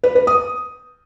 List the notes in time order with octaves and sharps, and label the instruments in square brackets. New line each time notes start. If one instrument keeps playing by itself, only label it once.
[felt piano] B4
B4
D#6